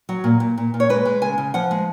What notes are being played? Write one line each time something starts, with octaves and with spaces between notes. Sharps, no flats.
F#3
A#2
A#2
A#2
A#2
C#5
G#3 B4
G#3
C#3 G#5
C#3
F3 F#5
G#3